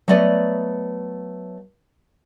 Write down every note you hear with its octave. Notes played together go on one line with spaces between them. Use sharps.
F#3 A3 B3 D5 D#5